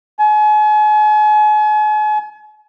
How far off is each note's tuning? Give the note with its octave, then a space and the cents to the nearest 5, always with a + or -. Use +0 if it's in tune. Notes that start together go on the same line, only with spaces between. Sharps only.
G#5 +40